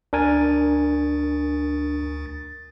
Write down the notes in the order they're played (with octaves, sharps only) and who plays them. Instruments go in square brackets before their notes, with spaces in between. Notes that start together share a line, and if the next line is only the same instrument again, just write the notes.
[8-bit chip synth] D2 A6 [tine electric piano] D4 A#4 G#5